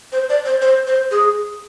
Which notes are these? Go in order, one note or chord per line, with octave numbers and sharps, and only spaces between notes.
C5
D5
C5
C5
C5
G#4